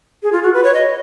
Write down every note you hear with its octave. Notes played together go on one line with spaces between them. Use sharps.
G#4
F4
F#4
B4
C#5
D#5